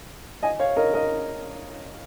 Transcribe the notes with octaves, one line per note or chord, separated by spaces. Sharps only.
D#5 G#5
C#5 F5
A#4 D#5
A#4 D#5